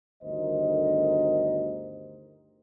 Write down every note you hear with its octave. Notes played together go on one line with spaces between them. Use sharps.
G1 D2 D#3 A#4 C5 D#5